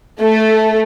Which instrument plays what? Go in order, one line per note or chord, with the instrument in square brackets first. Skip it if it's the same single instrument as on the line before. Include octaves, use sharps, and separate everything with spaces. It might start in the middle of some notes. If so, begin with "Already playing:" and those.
[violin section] A3